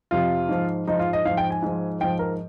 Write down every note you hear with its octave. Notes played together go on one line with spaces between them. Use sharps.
F2 C3 F3 F4
G#2 F3
G#2 F3 D#4
F4
D#5
G#2 F3 F5
G5
G#5
G#2 F3
G#2 F3 G5
A#4